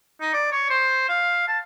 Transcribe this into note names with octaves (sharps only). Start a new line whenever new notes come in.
D#4
D5
C#5
C5
F5
A5